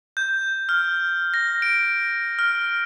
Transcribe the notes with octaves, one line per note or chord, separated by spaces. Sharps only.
G6
F6
A#6
D7
F6